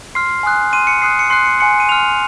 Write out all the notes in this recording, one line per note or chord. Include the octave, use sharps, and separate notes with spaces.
C6 F6 C7
G#5 C6 D#6 F#6
C6 F6 D#7
C#7
C6 D#6 F#6 C7
C#7
C6 D#6 F#6 C7
C#7
G#5 C6 F#6 C#7
D#7
C6 F6 F7